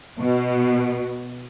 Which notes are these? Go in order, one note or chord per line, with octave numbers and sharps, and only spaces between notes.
B2